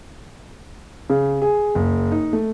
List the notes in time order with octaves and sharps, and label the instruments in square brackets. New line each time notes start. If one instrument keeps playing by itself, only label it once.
[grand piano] C#3
G#4
F#1
D#4
A3